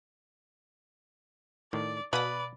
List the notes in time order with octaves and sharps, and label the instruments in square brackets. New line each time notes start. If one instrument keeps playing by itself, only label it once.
[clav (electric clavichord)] A2 D#3 [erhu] D5
[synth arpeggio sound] B2 D#6 [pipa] B4 [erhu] D5 [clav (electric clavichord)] F5 G#5 A5